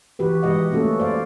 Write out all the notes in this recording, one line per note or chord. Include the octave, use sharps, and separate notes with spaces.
E3 F#4 G4 B4
E3 G#3 G4 D#5 F#5
A3 A#3 C#4 F#4 A4
C5 D5 F5